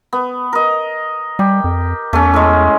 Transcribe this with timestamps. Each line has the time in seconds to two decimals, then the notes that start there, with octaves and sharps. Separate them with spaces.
0.13 B3
0.53 A#4 D#5
1.39 G3 G4
1.64 F2
2.13 E2 A3 C#4
2.34 A2 G#3